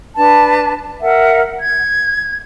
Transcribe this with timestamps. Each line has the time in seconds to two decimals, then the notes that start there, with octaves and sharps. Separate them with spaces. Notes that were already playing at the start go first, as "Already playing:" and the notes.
0.17 D4 B4 A5
1.01 A#4 E5 F#5
1.60 G#6